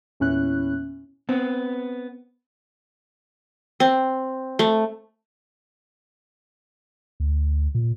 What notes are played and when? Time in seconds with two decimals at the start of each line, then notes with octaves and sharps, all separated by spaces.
0.20 E2 A#2 C#4 E4 F#6
1.29 B3 C4
3.80 C4
4.59 A3
7.20 D2
7.75 A#2